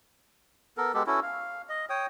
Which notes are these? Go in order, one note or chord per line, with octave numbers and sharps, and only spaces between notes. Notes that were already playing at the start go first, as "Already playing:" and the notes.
B3 A4 A#4
G#3 B3 G4 A4
C#4 E4 F#4 A4
F5
D#5
C#5 G5 D#6